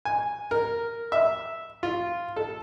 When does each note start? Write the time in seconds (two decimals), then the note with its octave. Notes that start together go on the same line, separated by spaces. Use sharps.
0.05 G#5
0.51 A#4
1.12 E5
1.83 F4
2.36 A4